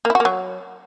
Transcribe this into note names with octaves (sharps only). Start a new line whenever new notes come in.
A#3
E4
F#4
A#3
F#3